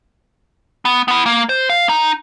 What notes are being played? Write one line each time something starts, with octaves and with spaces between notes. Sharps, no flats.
B3
B3 E4
A#3
C5
F5
D#4